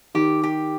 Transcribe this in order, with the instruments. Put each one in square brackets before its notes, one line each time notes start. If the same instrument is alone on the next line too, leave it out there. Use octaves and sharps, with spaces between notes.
[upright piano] D#3 [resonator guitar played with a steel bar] G4
[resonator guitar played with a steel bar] G4